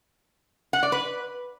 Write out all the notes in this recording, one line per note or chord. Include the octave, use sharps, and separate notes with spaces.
F#5
D5
B4